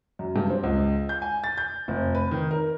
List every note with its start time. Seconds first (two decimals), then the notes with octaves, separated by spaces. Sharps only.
0.19 F#2
0.36 G2
0.50 C4
0.63 C#2
1.09 G6
1.22 G#5
1.44 A6
1.58 G6
1.88 F1
2.15 B4
2.31 D#3
2.51 A#4